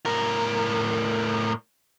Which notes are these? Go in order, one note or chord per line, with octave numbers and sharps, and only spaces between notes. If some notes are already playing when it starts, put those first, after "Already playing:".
A2 A#4